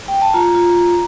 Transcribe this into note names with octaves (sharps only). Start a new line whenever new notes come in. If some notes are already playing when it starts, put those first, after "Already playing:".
G5
A5
F4 A#5
F4